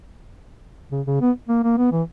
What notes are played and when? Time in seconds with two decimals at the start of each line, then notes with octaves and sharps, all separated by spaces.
0.92 C#3
1.07 C#3
1.21 B3
1.48 A#3
1.64 A#3
1.77 B3
1.92 E3